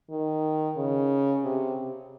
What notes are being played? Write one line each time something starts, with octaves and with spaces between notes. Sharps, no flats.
D#3
C#3
C3